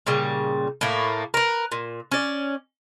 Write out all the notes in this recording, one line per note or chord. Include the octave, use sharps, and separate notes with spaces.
A#2 C#3 G3
A2 A3 A#3
A#4 B4
A#2
C#4 D5